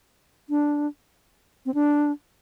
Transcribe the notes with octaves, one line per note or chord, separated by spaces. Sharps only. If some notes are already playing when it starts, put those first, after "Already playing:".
D4
C4
D4